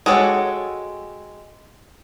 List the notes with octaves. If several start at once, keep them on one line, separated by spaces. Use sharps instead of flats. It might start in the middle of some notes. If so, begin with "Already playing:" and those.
G#3 F#4 G4 A4 C#5